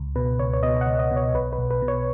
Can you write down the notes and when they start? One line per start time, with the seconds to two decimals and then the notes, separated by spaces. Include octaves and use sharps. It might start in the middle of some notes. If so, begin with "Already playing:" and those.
Already playing: C#2
0.16 B2 B4
0.39 C#2 C#5
0.53 C#5
0.63 B2 D#5
0.81 F#5
0.86 C#2
0.99 D#5
1.11 B2
1.16 C#5
1.34 B1 B4
1.53 B4
1.58 B1
1.71 B4
1.82 B2
1.88 C#5